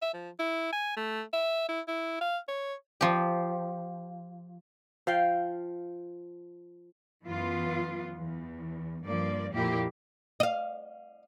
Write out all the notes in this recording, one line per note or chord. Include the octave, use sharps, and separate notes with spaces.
E5
F3
E4
G#5
A3
E5
E4
E4
F5
C#5
F3 G4
F3 F5 G5
F#2 E3 B3 F4
E2
G2 F3 A#3 D5
F2 A#2 A#3 E4 G4
D#5 F5